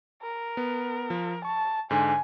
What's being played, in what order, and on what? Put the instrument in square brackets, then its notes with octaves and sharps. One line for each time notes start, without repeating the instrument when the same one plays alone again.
[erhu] A#4
[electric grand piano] B3
F3
[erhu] A5 [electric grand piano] C#6
[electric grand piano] G#2 D3 [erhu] G#5